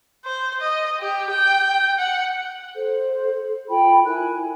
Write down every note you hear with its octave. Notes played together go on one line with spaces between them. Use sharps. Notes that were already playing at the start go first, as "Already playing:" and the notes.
C5
D#5
G4
G5
F#5
A4 C5
F4 G5 A5 B5
E4 A#4 G#5 F#6